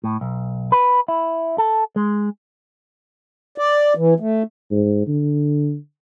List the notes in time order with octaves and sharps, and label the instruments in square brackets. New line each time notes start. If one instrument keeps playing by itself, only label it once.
[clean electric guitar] A2
B1
B4
E4
A4
G#3
[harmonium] D5
E3
A3
[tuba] G#2
D3